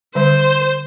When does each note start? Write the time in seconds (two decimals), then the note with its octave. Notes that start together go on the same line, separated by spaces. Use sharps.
0.15 D3 G3 C5